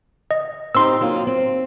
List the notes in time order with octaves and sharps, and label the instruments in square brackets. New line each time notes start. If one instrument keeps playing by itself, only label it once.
[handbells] D#5
[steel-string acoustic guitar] C4 D#4 G4 [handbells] C6 E6
[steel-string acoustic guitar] F#3 A#3 F4
C4